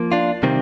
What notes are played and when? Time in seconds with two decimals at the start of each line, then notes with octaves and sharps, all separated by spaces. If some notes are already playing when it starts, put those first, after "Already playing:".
Already playing: F3 A#3
0.12 D4 F4
0.43 C3 D#3 G3 C4